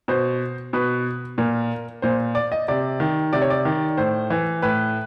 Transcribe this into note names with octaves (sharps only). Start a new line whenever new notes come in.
B2 C5
B2 B4
A#2 A#4
A#2 C5
D5
D#5
C3 D5
D#3
C3 D5
C#5
D5
D#3
A2 C5
E3
A2 B4